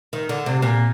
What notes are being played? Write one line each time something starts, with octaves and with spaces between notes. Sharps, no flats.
D#3
D3
C3
A#2